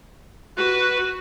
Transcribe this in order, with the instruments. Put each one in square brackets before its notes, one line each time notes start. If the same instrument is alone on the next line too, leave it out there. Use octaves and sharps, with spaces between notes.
[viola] F#4 [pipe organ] B4